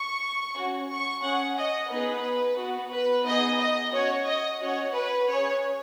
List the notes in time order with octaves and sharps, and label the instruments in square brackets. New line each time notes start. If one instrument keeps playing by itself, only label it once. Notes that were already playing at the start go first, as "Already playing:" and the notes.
Already playing: [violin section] C#6
C#4 F#4
C#6
C#4 G#4 F#5
D#5
B3 D#4 G#4 B4
B3 F#4
B4
B3 D#4 G#4 D#5
D#5
C#4 F#4 C#5
D#5
C#4 F#4 C#5
B4
C#4 G#4 C#5